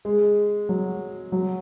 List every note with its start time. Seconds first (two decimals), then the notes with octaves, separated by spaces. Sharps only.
0.05 G#3
0.69 F#3
1.32 F#3